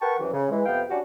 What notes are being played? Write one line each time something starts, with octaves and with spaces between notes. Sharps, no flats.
A#4 B4 F#5 G5 A5 C#6
C2 F#2 E3
C#3
E3 G#3
F2 C3 B3 F5 G5
G3 C#4 D4 F#4 G4